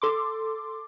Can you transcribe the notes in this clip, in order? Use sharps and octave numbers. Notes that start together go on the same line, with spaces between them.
A4 C6 D6